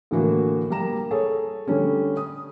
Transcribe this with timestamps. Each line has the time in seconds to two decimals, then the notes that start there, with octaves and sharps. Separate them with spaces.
0.11 A2 D3 E3 A#3 F#4
0.70 G3 A#3 A#5 E7
1.11 G#4 A4 C#5
1.67 D3 G3 A3 C#4
2.17 D#6